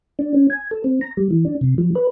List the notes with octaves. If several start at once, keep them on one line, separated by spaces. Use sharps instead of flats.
D4
C#4
G#5
A4
C4
A#5
G3
E3
D4
C3
F3
B4